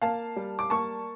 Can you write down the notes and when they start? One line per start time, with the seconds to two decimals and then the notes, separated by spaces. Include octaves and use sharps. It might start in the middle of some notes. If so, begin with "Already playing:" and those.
0.02 A#3 F5 A5
0.36 G3
0.59 D6
0.70 A#3 A5 C#6